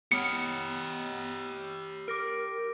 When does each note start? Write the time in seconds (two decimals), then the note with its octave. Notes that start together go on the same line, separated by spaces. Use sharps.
0.12 B3 G4 C#5 B5 D#6 F6 C#7
2.08 A#4 D6 A#6 D7